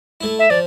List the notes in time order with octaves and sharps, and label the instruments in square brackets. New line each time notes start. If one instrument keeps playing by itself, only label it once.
[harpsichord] A3 E4
[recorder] E5
[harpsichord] F3 [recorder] D5